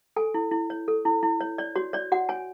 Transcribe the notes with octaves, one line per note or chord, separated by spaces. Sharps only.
A4 G#5
E4
E4
C#5
A4
E4
E4
C#5
C#5 D5
F#4 C#5
C#5 D5
F#4 F#5
C#5 G#5